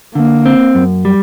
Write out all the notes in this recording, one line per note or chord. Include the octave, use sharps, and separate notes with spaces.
D3 A#3
C4
F#2
G3